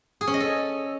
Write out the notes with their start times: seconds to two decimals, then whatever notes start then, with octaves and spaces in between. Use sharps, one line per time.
0.21 G#4
0.27 C#4
0.34 D#5
0.40 A4